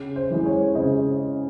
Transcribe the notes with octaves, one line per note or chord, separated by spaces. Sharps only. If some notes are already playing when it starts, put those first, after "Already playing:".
Already playing: C#3
C5
E3 G#3
C#5
C#3 C5 D#5